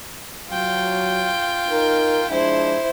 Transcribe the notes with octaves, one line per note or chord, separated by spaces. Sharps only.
F#3 F4 G5
D#4 A#4
F3 G#3 D4 E4 C5